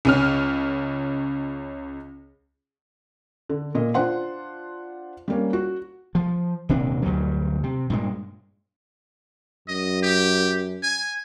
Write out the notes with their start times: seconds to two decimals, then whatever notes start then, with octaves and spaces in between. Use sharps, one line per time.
0.05 C#2 C#4 F6
3.49 D3
3.75 A#2 D#5
3.94 D4 F4 C5 F#5 C6
5.28 G3 A#3 C#4
5.53 F#4
6.15 F3
6.69 D#1 C3 D4
7.02 D2 G2 F#3
7.63 C3
7.90 G2 A#2 G#3
9.68 F#2 D#5
10.02 G4
10.83 G#5